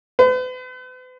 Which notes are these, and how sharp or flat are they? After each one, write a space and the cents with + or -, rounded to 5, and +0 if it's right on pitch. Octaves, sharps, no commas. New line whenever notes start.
B4 +45